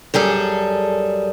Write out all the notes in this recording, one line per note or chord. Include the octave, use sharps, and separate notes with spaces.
F#2 G3 G#4 A4